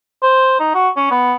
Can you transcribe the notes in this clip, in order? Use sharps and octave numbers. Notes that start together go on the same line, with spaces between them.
C5
D#4
F#4
C#4
B3